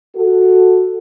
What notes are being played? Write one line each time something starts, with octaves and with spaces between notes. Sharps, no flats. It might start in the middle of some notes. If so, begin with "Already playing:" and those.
F#4 A4